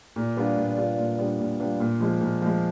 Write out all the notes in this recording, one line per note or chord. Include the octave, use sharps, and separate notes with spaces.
A#2
G3 B3 D4 F4
A#2
G3 B3 D4 F4
A#2
G3 B3 D4 F4
A#2
G3 B3 D4 F4
A#2
F3 G#3
A#2
F3 G#3